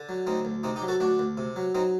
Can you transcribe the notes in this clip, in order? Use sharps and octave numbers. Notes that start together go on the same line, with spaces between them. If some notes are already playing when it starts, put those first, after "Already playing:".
Already playing: D3
F#3
D2 C4 D#4
D2
C3 C4 D#4
D#4 G4
F#3
F#4 A4
D2 D4 F#4
D2
C3
F#3
F#3 C4 D#4